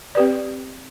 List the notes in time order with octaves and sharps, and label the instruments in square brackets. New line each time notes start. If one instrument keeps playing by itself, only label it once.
[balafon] C4 G4 B4 D5